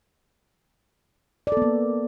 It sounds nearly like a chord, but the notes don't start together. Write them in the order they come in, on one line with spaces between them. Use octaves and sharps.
D5 A4 B3 A#3